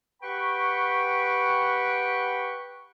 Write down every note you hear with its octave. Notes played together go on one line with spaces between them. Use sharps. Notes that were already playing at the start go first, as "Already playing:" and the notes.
G4 B4 F#5 G5 B5 C#6